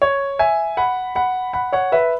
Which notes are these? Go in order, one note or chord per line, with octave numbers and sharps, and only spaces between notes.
C#5
E5 G#5
F#5 B5
F#5 B5
F#5 B5
C#5 F#5
B4 E5